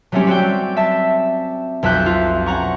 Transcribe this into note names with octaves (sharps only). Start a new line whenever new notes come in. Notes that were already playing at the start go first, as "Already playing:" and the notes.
F#3 G3 A3 C4 C#4 G4
C4 F#4 D5 G5
E5 A5
B1 F2 E5 A5 F#6 G6
F4
C#4 F#5 A#5 C#6